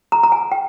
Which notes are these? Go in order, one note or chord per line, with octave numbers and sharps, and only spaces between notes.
A#5
A#5
G#5
G5